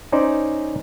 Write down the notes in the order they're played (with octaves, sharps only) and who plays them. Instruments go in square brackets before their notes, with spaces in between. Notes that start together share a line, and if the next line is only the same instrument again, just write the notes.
[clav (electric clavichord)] C#4 D#4 C5 D5